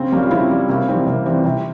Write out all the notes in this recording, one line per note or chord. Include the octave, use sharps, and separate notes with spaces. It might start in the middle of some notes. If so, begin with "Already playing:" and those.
Already playing: C#3 C4
G3 A#3 C#4
F4
C#3 C4 E4
G3
C3 A#3 C#4
E3 G3 C4
C3 A#3
E3 G3 C4
C3 C4